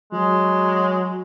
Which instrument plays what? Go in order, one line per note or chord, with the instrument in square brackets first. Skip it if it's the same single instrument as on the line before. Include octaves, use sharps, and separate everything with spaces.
[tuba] F#3 [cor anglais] G#3